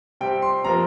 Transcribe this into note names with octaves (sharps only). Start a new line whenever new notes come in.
C3 G3 C4 G5
C6
C3 F3 A#3 A#5